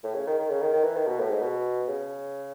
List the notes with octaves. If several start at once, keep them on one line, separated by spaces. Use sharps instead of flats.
A2
C#3
D#3
D#3
C#3
D#3
D#3
E3
D#3
B2
A2
G#2
B2
C#3